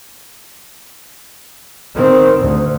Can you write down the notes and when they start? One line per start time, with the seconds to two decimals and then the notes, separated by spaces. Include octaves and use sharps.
1.95 D#3 C4
2.40 D2